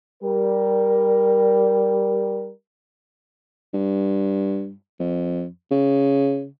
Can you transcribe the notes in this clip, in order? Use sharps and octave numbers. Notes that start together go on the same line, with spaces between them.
G3 A#4
G2
F2
C#3